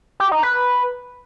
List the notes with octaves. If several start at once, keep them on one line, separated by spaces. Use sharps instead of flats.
G4
D#4
B4